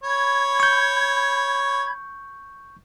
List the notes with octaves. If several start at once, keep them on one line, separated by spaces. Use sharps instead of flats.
C#5 B5 G#6
C#6 G6